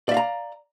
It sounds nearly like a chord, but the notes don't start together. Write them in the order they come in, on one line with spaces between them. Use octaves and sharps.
D5 E5 F5 A#5